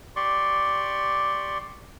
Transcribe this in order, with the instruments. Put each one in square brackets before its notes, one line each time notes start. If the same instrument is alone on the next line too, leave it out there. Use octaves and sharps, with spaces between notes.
[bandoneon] G4 D5 C6 C#6